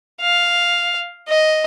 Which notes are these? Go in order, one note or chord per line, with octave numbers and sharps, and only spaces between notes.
F5
D#5